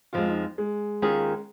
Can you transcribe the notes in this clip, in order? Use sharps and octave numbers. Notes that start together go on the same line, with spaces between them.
F2 F3 G#3 F4
D#4
G#3
D#2 D#3 C#4 F4 G#4